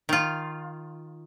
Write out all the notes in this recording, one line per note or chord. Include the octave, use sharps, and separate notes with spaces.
D#3 F4